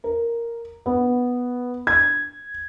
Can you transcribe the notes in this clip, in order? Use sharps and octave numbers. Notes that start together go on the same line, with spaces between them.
A#4
B3
G#6